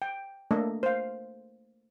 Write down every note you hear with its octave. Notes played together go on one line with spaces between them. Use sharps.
G5
A3 A#3 D4 A4 D#5
C5 F5